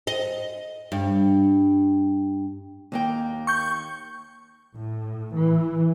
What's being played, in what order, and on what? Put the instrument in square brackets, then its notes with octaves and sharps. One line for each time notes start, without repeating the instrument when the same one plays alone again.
[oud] D#5
G2
[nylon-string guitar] D#2 A#3 G5
[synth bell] C#6 G6
[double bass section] A2
E3